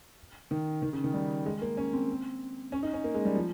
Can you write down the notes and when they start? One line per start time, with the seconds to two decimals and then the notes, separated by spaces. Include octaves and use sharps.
0.51 D#3
0.82 D#3
0.93 C#3
1.04 D#3
1.14 G3
1.46 G#3
1.62 A#3
1.77 C#4
1.93 C4
2.72 C#4
2.83 D#4
2.93 C#4
3.04 A#3
3.14 G#3
3.25 G3
3.36 F3